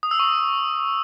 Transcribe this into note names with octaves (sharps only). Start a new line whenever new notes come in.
D#6
E6
C#6